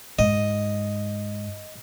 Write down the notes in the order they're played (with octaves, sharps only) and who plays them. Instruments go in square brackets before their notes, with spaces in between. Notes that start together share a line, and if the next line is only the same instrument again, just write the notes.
[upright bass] G#2 [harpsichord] D#5